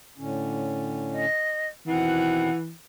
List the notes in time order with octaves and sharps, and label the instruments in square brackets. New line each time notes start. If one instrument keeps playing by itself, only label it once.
[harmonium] A2 D3 C#4
[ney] D#5
[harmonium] B2 D#3 C4 [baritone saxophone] E3 [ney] F#5